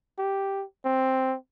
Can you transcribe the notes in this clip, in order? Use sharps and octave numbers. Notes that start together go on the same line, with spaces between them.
G4
C4